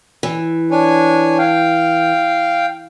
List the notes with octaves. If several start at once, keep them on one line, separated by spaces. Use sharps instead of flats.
E3
D4 C#5 G#5
F5 G5